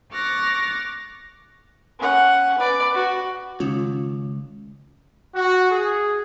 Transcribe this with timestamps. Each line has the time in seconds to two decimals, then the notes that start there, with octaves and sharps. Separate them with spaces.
0.12 C#6 D6 F6 F#6 A6 A#6
1.99 C#4 F#5
2.58 B4 D5
2.94 F#4
3.60 C#2 D#3 C#4 F4
5.33 F#4
5.71 G#4